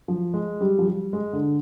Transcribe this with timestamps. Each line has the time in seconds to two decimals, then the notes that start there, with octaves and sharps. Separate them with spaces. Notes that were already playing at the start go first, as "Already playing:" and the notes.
0.08 F3
0.34 G#3
0.61 G3
0.79 F3
0.87 G3
1.13 G#3
1.33 D3